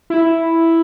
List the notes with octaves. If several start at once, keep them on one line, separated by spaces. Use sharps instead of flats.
E4